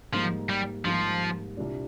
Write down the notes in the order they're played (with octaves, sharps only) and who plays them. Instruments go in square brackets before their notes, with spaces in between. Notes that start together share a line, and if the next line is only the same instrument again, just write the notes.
[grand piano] G#2 G3 A#3 [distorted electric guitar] F3
[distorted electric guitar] G3
[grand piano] G#2 G3 A#3 [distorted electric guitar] F3
[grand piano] C2 A#2 G3 D4